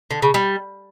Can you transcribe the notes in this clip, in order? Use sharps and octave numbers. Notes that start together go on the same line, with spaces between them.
D3
C#3
G3